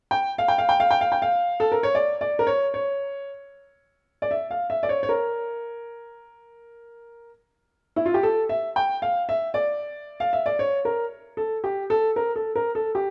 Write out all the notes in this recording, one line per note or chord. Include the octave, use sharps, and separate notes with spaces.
G5
F5
G5
F5
G5
F5
G5
F5
G5
F5
A4
A#4
C#5
D5
D5
A#4
C#5
C#5
D5
E5
F5
E5
D5
C#5
C#5
A#4
E4
F4
G4
A4
E5
G5
F5
E5
D5
F5
E5
D5
C#5
A#4
A4
G4
A4
A#4
A4
A#4
A4
G4